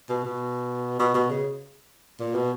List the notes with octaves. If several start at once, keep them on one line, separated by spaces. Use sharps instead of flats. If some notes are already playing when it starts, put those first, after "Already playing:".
B2
B2
B2
B2
C#3
A#2
B2